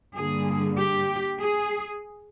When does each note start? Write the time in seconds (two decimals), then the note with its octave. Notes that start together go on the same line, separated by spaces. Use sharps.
0.14 G2 D3 G3 A#3 G#4
0.77 G4
1.39 G#4